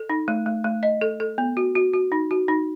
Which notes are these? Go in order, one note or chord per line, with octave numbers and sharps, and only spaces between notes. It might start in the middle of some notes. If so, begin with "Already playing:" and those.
Already playing: A4
D#4
A3
A3
A3
D#5
A4
A4
B3
F#4
F#4
F#4
D#4
F#4
D#4